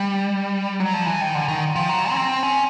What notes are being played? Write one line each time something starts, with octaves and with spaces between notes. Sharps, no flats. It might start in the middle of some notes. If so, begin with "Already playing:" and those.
Already playing: G3
F#3
F3
E3
D#3
D3
D#3
F3
F#3
C#4
C4
C#4